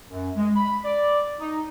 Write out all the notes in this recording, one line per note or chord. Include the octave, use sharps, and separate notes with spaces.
F#2
G#3
B5
D5
D#4